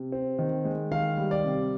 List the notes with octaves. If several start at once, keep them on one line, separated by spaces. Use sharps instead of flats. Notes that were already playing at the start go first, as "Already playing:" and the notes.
Already playing: C3
C4
D#3
G#3
D#3 F5
G3
D5
C3